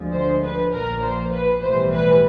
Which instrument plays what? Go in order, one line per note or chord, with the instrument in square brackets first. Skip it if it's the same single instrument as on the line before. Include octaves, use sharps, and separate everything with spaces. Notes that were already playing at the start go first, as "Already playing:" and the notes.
Already playing: [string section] D2 D3 F3 G#3
C5
B4
A#1 A#2 F3 A#4
C5
B4
B1 A2 E3 G3 C5
B4